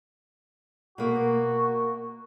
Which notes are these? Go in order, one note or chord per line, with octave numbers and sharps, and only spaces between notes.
B2 A#3 F#4